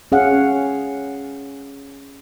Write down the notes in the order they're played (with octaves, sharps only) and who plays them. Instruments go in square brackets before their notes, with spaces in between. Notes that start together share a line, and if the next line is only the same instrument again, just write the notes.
[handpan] C#4 G#4 F5 F#5